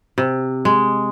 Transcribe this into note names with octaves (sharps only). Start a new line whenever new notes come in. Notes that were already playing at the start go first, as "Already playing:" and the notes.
C3
G#3